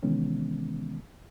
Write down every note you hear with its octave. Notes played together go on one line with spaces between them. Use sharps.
C3 D#3 E3 G#3 B3 C#4